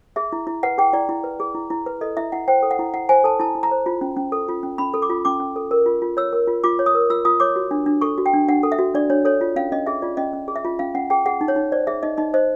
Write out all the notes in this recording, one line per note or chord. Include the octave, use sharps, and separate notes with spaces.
G#4 E5
E4
E4
B4 F#5
G#4 G5
E4 D5
E4
B4
G#4
E4
E4
B4
A4 D#5
E4 E5
E4 F#5
C5 G5
A4
F#5
E4
E4 F#5
C5 G#5
A4 A5
E4 A5
E4
A#5
C5
F4
C#4
C#4
A4
F4
C#4
C#4 B5
A4
D6
F4
C#4 D6
C#4
A4
A#4
F4
F4
C#5 E6
A#4
F4
F4 D6
C#5
D#6
A#4
F4 E6
F4 D#6
C#5 D6
F#4
D4
D4
A4 C#6
F#4
G5
D4
D4 F#5
A4
E5
F#4
D4 D5
D4 C#5
A4 C#5
F4
C#4 F5
C#4 D#5
G#4 E5
F4 D5
C#4 D#5
C#4
G#4
E5
F4
C#4 F5
C#4 F#5
G#4 G5
G#4 F#5
D#4
C#5
D#4
C5 D5
G#4 E5
D#4 D#5
D#4 D#5
C5 D#5